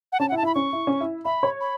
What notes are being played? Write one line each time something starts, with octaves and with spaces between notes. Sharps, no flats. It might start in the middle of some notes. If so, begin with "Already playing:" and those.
F#5
C#4 A5
F#5
E4
A5
E4 B5
C#4 C#6
E4
C#4
E4
E5 B5
C#5
B5